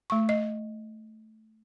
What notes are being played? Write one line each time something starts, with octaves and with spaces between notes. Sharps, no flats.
A3 C#6
D#5